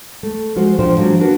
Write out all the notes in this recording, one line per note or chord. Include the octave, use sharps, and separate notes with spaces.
A3
F3 G#3 F#4 C5
A#2 F3 D4 C5 G5
F3 F#3 G#3 D4
A#3 D4 F#4 A#4 B4